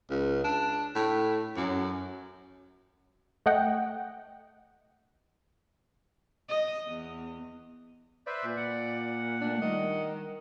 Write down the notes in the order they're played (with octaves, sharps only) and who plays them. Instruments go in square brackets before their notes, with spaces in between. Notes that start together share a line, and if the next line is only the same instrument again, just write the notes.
[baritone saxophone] C#2
D4
A2
F#2
[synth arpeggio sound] A3 D#5 F#5 G5
[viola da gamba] D#5
E2
[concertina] B4 C5 E5 [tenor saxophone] D5
[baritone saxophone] A#2
[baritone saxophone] A#2 [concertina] F#5
[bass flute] A3 [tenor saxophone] D4
[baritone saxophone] D#3 [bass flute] G3 [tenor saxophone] D#5